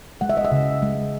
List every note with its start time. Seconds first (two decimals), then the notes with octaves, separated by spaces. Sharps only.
0.21 G#3 F#5
0.29 E5
0.37 D#5
0.45 E5
0.52 C#3
0.82 G#3